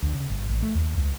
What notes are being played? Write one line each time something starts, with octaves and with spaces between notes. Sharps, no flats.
D2
C#3
G1
A1
A3
D#2
C#2